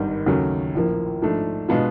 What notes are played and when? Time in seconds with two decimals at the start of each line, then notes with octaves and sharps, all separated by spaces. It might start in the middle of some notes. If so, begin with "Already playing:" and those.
Already playing: G#1 G2 D#3 G3
0.26 D#2 C#3 F#3 A3 C#4
0.75 A#1 A2 F3 A#3
1.22 G#2 F3 A3 D4
1.68 B2 G#3 B3 D4 F4